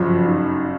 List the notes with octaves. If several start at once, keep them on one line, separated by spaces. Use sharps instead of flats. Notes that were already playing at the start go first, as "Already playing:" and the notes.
Already playing: G1 F#2 C#3 F3 F4
D#4